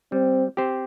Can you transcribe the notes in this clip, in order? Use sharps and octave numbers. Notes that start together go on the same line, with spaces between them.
G3 C4
C4 G4 C5